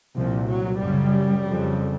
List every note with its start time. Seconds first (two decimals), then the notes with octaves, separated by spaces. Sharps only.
0.16 C2 A#2 F3
0.49 F#3
0.80 F#2 C#3 G3
1.45 F2 C#3